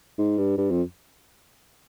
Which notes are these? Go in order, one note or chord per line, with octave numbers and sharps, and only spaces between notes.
G#2
G2
G2
F2